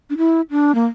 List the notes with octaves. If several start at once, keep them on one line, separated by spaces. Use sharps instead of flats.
D4
E4
D4
A#3